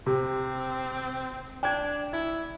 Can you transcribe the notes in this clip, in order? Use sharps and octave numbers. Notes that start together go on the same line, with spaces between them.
C3 C4
D4 G5 G#6
E4 G#6